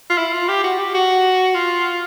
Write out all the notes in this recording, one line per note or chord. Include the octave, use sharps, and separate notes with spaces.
F4
E4
F4
G4
F#4
G4
F#4
F4